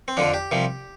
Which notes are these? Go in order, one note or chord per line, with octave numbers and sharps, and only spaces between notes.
C4
F2 D3 F3 D4
G4
C2 C3 F3